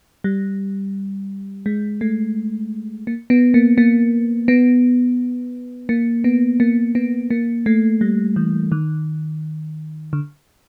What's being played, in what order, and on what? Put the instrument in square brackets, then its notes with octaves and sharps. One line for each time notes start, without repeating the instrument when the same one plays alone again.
[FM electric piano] G3
G#3
A3
A#3
B3
A#3
A#3
B3
A#3
B3
A#3
B3
A#3
A3
G3
E3
D#3
D3